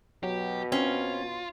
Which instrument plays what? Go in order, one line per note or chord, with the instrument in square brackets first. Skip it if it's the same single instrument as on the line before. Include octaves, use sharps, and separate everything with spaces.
[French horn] B2 [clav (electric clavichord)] F#3 [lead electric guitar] G4
[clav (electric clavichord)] C4 [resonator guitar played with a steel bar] C#4 [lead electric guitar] F4